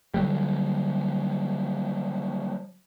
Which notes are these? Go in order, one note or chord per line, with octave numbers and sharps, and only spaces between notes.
D3 F#3 G3